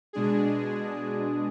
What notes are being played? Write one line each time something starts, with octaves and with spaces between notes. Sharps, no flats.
B2 G#3 D4 G#4